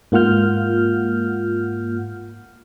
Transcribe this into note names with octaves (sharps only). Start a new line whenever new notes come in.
G#2 A#3 F4 F#5 F6 G6